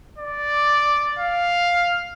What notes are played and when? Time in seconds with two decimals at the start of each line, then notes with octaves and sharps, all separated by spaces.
0.18 D5
1.19 F5